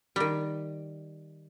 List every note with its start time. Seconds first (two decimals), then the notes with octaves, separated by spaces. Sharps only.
0.16 D#3 G3